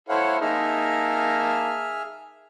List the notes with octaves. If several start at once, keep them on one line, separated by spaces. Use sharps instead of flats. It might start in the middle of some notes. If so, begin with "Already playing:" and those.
E4 A4 C5 C#5 F5 F#5
A#3 D#4 G#4 E5 A5 F6